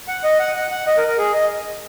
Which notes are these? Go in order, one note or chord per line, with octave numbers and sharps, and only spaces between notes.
F#5
D#5
F#5
F#5
F#5
D#5
A#4
A#4
G#4
D#5